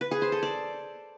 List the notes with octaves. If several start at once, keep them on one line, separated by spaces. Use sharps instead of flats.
B4
G#4
C5
A4
D5